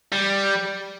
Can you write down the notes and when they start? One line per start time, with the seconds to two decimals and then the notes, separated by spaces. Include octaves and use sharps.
0.12 G3